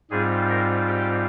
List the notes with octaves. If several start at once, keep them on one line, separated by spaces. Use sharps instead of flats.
G#2 G3 C4 F4 G#4
A#4
G4